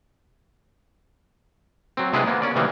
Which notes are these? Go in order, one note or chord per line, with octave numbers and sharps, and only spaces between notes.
F#3 C4
C3 G#3 B3 D4 E4 B4
A#3 B3
C#4 D5
C3 D#3 E3 F#3 G3 A#3